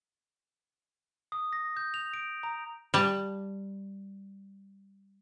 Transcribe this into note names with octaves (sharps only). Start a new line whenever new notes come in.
D#6
A#6
G6
F7
D7
A#5
G3 A5